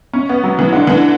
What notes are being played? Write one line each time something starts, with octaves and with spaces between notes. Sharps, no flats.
C#4
B3
F#3
E3
D3
E3